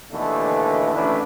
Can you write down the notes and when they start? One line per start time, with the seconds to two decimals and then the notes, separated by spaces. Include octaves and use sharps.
0.11 D#2 B2 D3 E3 A3
0.93 A1 A3 D4 E4 B4